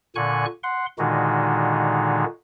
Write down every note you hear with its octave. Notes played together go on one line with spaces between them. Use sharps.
A#2 D3 G#5 C#6 F#6
F#5 C6
A#2 D3 D#3 G#3 D#4 F#4